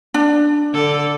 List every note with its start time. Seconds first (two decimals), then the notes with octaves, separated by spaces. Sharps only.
0.14 D4
0.73 D3 A4